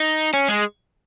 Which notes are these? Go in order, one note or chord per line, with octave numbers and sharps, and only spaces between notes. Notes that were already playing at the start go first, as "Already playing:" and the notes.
Already playing: D#4
C#4
G#3